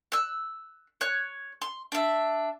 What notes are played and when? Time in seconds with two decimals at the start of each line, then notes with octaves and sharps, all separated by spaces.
0.12 E6 F#6
1.01 C#5 F#6
1.62 C6
1.92 D4 E5